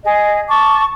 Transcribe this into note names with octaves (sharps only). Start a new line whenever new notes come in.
G#4 D#5
A5 C#6 D6